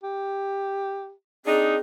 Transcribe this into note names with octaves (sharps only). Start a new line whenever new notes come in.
G4
C4 D4 D#4 G#4